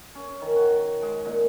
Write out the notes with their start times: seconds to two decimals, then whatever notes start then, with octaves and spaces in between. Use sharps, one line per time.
0.15 C#4
0.42 D#3
0.56 F#4
1.02 G#3
1.25 A#2